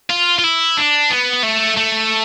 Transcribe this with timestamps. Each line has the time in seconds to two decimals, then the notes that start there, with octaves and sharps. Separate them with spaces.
0.10 F4
0.39 F4
0.44 E4
0.77 D4
1.11 B3
1.43 A3
1.77 A3